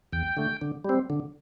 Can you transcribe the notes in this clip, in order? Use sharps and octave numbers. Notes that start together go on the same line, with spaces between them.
E2 G5
D3 A3
D3
G3 C4
D3